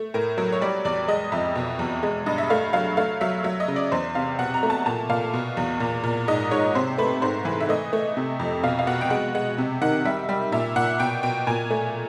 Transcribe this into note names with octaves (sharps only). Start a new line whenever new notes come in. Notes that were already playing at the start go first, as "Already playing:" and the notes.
Already playing: A3
A2 A#4
F#3 A#4
C#5
G3 D5
E2 D5
G#3 D#5
F2 E5
B2
E2
G#3
G2 D#5
E5
A3 F5
F#3 F5
A3 F5
F#3 E5
F#3 E5
D#5
C#3
D5
E2 C5
C3 F5
B2 F#5
A#5
A3
A5
A#2 A5
A#2 F5
B2
E2
A#2
A#2
G#2 D#5
G#2 C#5
C3 C5
A3 B4
G#2 C5
E3 B4
E5
A3 D#5
A3
C3
F2
B2 F5
F5
B2 F#5
G5
G#3 F#5
G#3 F#5
C3
D#3 F#5
G3 E5
G3
A#2 E5
A#2 F#5
B2 G5
B2 G5
A#2 G#5
A3